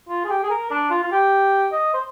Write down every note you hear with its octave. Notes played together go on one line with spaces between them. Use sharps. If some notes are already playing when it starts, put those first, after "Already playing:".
F4
G#4
G4
G#4
A#4
D4
F4
F4
G4
D#5
C5